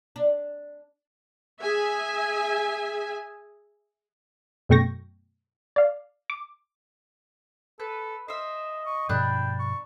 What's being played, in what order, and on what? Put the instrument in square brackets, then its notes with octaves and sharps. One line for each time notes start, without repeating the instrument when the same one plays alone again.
[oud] D4
[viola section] G#4 E5 G#5
[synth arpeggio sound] F#2 B2 A3 G5 C#6 A#6
D5 F5
D6
[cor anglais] A4 [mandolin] B4
[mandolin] C5 E5 [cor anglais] D#5
[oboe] C#6
[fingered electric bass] G2 B2 F3 [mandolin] D4 B5 F#6 [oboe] G5
[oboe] C#6